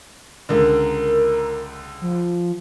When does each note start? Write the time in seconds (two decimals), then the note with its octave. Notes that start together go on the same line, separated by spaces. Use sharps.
0.49 C#2 D3 A#4
2.01 F3